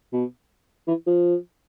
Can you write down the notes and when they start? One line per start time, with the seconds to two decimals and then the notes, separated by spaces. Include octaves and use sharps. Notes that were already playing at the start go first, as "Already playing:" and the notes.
0.12 B2
0.87 E3
1.06 F3